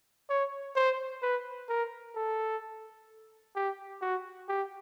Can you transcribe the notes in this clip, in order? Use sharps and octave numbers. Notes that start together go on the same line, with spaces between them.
C#5
C5
B4
A#4
A4
G4
F#4
G4